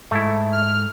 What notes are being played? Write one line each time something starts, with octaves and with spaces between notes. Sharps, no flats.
G#2 A3 E4
F6